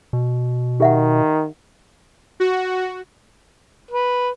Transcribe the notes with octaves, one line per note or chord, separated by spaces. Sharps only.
B2
D#3 G4 E5 F#5
F#4
B4